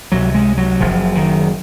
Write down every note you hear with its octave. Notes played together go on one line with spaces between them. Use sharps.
C#2 C3 F#3
G#3
F#3
F#1 F#2 C#3 F3
D#3